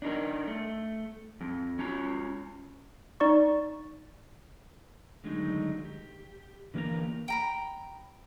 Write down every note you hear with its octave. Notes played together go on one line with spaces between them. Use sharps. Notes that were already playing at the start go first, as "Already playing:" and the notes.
D4 D#4 A4 A#4
A3
F2
C#4 F4 A#5
D#4 D5 C#6
D3 D#3 F#3 G#3 A3 D#4
G4
D3 E3 A#3 G4 A#4 A#5
G5 A#5 B5